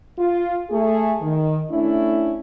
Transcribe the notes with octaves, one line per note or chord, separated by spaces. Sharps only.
F4
A3 G#4
D#3
A3 C#4 D4 E4